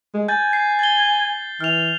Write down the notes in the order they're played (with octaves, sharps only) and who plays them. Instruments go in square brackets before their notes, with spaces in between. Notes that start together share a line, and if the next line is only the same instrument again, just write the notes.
[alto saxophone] G#3
[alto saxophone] G#5 [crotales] G6 A6
[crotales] C7
A6 G7
[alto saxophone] E3 [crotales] F6 F7